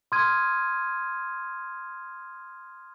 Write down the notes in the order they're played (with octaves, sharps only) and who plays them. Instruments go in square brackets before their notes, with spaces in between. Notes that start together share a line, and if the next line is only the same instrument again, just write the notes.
[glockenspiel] C6 D#6 F6 G#6 D#7